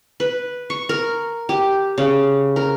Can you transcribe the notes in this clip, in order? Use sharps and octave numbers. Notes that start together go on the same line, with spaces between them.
B4
C#6
A#4
G4
C#3
A#4